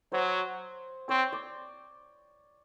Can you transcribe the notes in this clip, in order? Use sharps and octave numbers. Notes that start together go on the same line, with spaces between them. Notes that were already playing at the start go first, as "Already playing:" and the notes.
F#3 C5
C4 C#5
D5